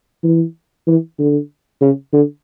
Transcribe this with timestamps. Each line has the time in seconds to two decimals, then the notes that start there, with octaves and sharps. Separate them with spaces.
0.23 E3
0.87 E3
1.19 D3
1.81 C#3
2.13 D3